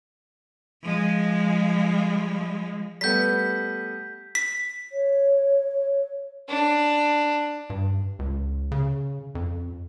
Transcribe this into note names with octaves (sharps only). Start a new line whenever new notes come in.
F3 G#3
G3 A3 B3 G6 B6
B6
C#5
D4
G2
C#2
C#3
F2